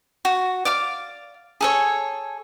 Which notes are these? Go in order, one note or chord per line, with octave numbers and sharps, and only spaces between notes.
F#4
D5 F5 D6
G#4 A4 C#5